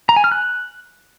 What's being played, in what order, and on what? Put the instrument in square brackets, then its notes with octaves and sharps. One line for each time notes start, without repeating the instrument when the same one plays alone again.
[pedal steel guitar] A#5
G#5
F6
F#6